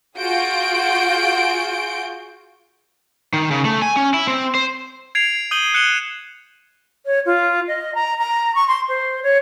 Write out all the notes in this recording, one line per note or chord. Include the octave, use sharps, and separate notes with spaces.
F4 F#4 G#4 G6 D7
D#3
C#3
A3
G#5
C#4
E4
C4
C5
G#6 C7 D7 F7
D#6 G6 D#7 F#7 G7
F#6 C#7 D#7 E7 F#7 G7
C#5
F4
D#5
A#5
A#5
C#6
C6
C5
C#5